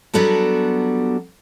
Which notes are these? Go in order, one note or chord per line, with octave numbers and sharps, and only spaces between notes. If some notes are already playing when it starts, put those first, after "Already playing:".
F#3 G3 B3 D4 F#4 A4